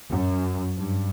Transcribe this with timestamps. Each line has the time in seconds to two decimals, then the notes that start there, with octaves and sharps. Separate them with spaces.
0.11 F#2
0.75 G2